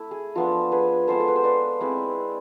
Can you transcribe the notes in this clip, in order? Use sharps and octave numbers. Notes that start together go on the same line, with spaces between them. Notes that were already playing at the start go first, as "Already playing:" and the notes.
Already playing: A3 E4
G#4
F3 B3 D4 F4 A4
G#4 B4
G#3 B3 F4 A4 C5
A4
B4
C5
B4 D5
G#3 C4 E4 B4 D5